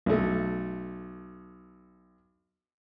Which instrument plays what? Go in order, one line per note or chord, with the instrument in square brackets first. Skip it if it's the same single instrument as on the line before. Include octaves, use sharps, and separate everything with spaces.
[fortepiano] B1 A3